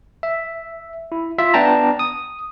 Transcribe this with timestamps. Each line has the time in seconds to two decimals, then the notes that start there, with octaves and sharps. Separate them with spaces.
0.23 E5
1.12 E4
1.38 F4 E5
1.54 B3 D4 G5 A5 A#5
1.99 D#6